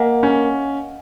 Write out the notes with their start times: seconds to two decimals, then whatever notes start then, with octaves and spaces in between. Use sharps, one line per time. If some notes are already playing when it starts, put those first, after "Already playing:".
Already playing: A#3 D#5 F5 F#5 G#5
0.23 C#4